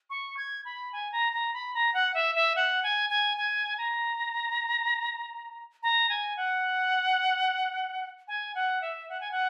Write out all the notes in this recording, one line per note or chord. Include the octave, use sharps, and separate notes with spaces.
C#6
G#6
B5
G#5
A#5
A#5
B5
A#5
F#5
E5
E5
F#5
G#5
G#5
G#5
A#5
A#5
G#5
F#5
G#5
F#5
E5
F#5
G#5
F#5